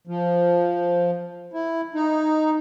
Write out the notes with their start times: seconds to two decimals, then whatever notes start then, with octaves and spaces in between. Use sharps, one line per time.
0.07 F3
1.53 E4
1.95 D#4